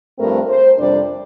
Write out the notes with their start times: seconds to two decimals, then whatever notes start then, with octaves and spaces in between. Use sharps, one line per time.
0.18 G2 F3 A3 C4 A#4
0.50 C5
0.79 F2 C3 G3 D4 D5